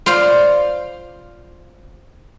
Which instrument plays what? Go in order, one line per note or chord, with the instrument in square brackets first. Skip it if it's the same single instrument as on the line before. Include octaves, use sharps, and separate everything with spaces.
[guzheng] F4 C5 D5 F5